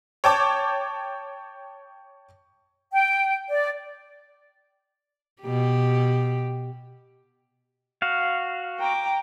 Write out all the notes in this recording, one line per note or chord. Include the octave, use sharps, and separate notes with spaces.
C#5 G5 A5 D6
G5
D5
B2 G4
F#4 F5
G5 A#5 D6